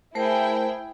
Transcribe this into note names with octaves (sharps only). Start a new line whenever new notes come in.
A3 E4 G#4 A#4 C5 G5